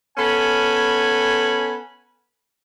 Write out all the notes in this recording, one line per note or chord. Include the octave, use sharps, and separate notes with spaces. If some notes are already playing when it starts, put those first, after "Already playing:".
B3 C#4 A4 G#5 B5